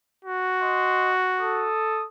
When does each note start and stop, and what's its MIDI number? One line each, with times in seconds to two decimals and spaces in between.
0.25 1.72 66
0.61 1.13 75
0.61 1.13 84
1.40 2.06 69
1.40 2.06 87